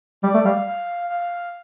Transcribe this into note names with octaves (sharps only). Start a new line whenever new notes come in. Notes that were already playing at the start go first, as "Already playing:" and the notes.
G3 D5
A3
G3 F5
F5
F5